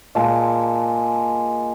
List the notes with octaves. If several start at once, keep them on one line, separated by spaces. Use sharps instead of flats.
A#2 G#3 A5